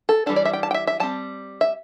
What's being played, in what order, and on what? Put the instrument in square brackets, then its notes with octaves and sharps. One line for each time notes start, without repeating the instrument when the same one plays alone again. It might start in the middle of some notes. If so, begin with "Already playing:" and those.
[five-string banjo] A4
E3 G3 D4 A4
D5
E5
G5
A5
G5
E5
E5
G3 C4 A5
E5